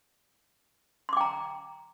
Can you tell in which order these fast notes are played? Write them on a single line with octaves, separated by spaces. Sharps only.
C6 D6 G5 A#5